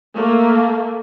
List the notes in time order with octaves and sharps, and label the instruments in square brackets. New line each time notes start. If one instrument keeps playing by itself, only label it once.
[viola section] A3 A#3